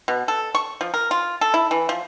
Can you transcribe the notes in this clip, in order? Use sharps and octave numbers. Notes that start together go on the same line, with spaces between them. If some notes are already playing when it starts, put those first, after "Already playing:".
B2
A4
C#6
F3
A#4
F4
A4
E4
E3
F3